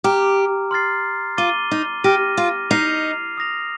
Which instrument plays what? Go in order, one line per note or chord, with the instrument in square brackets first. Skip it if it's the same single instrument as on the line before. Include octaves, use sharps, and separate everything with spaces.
[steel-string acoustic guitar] G4 [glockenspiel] A#5 D6 F6
[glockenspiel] C6 F6 A6 C7
[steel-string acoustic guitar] F4 [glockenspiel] D6 A6 D#7 G7
[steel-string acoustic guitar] D#4
[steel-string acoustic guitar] G4 [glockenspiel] D6 F6 A#6 D#7
[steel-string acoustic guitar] F4
[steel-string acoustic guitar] D#4 [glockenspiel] F6 C7 F7
[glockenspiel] D#6 A#6 F7